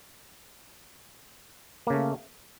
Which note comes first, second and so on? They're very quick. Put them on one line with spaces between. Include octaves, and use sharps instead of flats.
A#3 C#3 A3